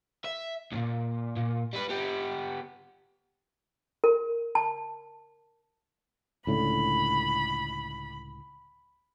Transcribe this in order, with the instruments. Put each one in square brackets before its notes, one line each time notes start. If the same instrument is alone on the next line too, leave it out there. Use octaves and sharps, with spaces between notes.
[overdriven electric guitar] E5
C#2 A#2
A#2
G3 B4
B3 G4
[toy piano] A#4
A5
[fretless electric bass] C#2 A2 D3 [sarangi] B5